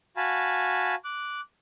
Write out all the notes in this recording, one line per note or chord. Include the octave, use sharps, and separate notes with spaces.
F#4 F5 G#5 A5 B5
D6 F#6